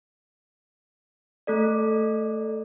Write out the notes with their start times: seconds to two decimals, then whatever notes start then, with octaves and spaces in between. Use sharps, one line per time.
1.47 A3 A4 D5